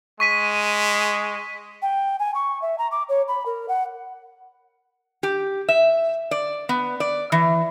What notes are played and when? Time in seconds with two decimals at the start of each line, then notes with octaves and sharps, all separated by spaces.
0.20 G#3 C#6 B6 D#7
1.82 G5
2.19 G#5
2.34 C#6
2.62 E5
2.78 A#5
2.91 D6
3.09 C#5
3.28 B5
3.46 A#4
3.69 F#5
5.23 G4
5.69 E5
6.31 D5
6.69 B3
7.00 D5
7.32 E3